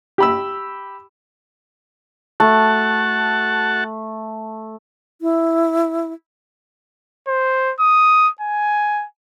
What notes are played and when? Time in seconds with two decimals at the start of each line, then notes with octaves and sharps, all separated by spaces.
0.18 G4 B5 E6
2.40 A3 F#4 F#5 A5
5.21 E4
7.28 C5
7.80 D#6
8.41 G#5